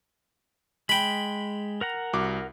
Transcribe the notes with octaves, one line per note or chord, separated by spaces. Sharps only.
G#3 G5 B5
A#4 F#5 A#5
C2 F#4 D6